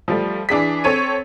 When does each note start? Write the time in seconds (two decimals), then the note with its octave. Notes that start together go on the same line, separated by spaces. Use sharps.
0.08 F3 G3 A3
0.49 E3 D4 G#4 B6
0.84 C4 A4 C#5 D#7